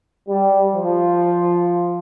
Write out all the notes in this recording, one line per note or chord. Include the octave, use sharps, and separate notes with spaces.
G3
F3